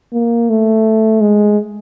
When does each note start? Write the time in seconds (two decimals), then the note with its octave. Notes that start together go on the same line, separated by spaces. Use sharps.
0.13 A#3
0.50 A3
1.21 G#3